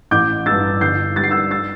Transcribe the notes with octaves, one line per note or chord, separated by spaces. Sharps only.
A1 D6 G6
G2 G3 E6 A6
G1 G6 C7
G2 G3 A6
C7
E6 A6
E6 A6